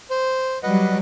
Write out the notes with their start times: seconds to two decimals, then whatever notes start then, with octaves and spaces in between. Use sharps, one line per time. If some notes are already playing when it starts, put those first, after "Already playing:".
0.10 C5
0.63 F#3 G3 B4 D#5 F#5